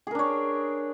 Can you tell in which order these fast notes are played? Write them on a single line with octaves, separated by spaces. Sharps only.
G#4 A#4 D4 C#5